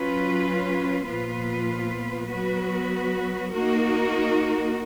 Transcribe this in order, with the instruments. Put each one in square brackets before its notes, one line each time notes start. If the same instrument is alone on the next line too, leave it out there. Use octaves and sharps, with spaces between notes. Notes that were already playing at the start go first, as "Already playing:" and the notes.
Already playing: [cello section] F#3 C#4 F4 B4
A#2 F3 B3 F4 B4
F#3 B3 F#4 B4
A#3 D#4 F#4 A#4